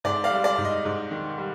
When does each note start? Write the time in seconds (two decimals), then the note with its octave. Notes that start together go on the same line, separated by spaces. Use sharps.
0.04 G#2 D5
0.24 D5 F5
0.31 G3
0.44 D5
0.58 G#2
0.65 D#5
0.85 G#2
1.11 D#3
1.38 G3